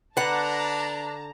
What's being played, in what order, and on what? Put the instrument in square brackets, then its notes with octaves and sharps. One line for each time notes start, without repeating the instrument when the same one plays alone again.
[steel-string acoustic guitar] D3 F#5 [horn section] D4 [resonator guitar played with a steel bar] B4 [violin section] A5 A#5